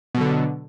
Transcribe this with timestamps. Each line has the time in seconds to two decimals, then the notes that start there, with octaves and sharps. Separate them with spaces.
0.15 B2
0.18 F#3
0.21 D3